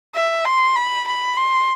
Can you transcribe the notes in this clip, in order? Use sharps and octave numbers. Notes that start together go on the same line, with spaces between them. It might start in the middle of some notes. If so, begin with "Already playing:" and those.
E5
C6
B5
B5
C6